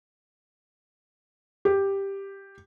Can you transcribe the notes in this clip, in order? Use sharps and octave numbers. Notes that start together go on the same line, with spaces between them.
G4